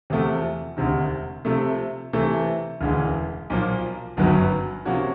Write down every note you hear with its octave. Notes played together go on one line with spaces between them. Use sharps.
E2 C3 F3 A3
E1 D2 C3 D#3
C3 F3 A3
C3 E3 A3
E1 D2 C#3 E3
B1 A#2 F3 A#3
G1 F#2 D#3 F#3 B3
C3 F3 A#3 C#4 F#4